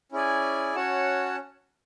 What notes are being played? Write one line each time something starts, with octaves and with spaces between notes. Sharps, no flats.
C#4 E4 G#4 D5 G#5
C#4 F#4 C#5 F#5 A5